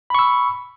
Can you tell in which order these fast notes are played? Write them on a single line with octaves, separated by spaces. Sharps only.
B5 C#6 E6